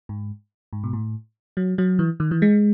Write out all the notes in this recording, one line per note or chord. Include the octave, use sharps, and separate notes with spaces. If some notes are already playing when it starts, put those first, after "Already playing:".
G#2
G#2
B2
A2
F#3
F#3
E3
D#3
E3
G#3